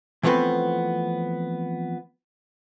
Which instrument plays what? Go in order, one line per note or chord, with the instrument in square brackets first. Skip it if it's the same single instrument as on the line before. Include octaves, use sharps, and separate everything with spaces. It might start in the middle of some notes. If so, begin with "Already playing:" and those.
[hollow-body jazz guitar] E3 F3 A3 B3 C4 B4